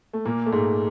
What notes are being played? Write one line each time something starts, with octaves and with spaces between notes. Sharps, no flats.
A3
A#2 A#3
A3
G#2 G#3